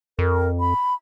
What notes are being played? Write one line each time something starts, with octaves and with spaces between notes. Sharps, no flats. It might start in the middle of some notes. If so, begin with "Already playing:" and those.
F2 A#4
B5